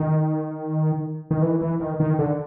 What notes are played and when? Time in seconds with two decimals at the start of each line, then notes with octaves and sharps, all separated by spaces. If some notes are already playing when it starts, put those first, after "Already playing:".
Already playing: D#3
1.31 D#3
1.42 E3
1.62 E3
1.80 D#3
2.00 D#3
2.19 D3